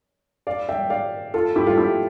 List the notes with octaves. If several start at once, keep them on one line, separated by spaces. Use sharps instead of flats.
D5 F5
E5 G5
D5 F5
F4 A4
E4 G4
F4 A4
E4 G4